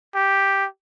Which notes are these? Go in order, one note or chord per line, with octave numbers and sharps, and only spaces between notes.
G4